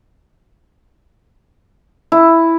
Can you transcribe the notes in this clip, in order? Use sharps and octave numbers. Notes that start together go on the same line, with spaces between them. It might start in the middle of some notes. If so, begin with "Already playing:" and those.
E4